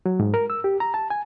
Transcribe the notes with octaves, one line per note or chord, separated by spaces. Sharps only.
F#3
G#2
A#4
E6
G4
A#5
A5
G#5